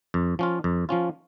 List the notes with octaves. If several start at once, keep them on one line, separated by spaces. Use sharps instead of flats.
F2
F3 C#4 F4
F2
F3 C#4 F4